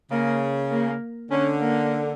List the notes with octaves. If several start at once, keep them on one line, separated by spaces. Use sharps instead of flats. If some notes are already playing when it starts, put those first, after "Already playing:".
C#3 A#3
A#3
D3 C#4
A#3